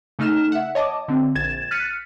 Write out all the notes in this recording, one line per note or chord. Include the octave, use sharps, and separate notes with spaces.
C#3 A3 D#4 F6 E7
E5 F#5
C#5 D#5 A5 D6
D3 C4
A#1 G#6 A6 E7
F6 F#6 A6 B6 C#7 D#7